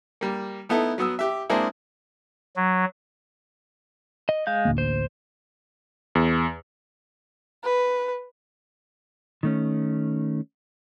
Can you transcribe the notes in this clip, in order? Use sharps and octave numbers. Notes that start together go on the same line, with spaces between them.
G3 A#3
A3 B3 D#4 E4 A4
F#3 B3 D#6 E6
G4 E5
G#3 A#3 C4 D4 E4 G#4
F#3
D#5
G#3 F5 G6
A1 D2 A#3
C5
E2
B4
D#3 A3 C#4